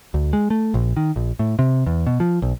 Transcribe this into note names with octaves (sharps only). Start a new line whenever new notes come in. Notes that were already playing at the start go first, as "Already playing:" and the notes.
D2
G#3
A3
A#1
D#3
A#1
A2
C3
E2
B2
F3
B1